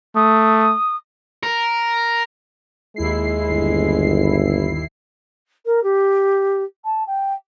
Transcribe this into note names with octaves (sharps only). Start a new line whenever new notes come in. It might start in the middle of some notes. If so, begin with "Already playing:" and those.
A3 D#6
A#4
D#2 G#3 E4 C7
G1
A#4
G4
A5
G5